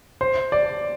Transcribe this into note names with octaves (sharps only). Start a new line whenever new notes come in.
C5
D5